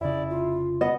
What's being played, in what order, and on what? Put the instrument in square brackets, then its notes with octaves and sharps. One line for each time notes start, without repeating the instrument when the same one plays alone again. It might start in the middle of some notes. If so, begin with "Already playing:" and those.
[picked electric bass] F1 C#3 [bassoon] E4 [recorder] D5
[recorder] F4
[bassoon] B3 [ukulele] D#5